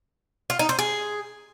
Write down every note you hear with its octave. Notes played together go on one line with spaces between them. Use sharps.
F4
D#4
C5
G#4